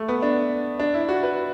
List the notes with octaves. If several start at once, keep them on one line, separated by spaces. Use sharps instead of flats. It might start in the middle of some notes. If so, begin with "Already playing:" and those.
Already playing: A3
B3
D4
D4
E4
F#4
B4